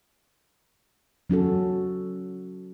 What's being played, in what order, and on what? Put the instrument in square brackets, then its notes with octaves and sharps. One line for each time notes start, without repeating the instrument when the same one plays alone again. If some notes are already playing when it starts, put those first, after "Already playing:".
[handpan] F#3 C#4 F#4 A4